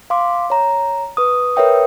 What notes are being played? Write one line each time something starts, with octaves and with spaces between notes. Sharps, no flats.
F5 C6 D6
C#5 A#5
B4 C#6 D#6
A#4 B4 C#5 E5 G5 D#6